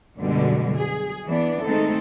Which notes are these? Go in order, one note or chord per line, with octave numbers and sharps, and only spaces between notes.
F#2 B2 D3 G3 G#3
G#4
E3 B3 D4
D#3 G#3 A3 C4 D#4 A4